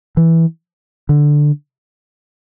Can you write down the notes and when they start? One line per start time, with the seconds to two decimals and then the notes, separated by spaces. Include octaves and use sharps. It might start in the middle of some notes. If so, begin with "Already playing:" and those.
0.17 E3
1.09 D3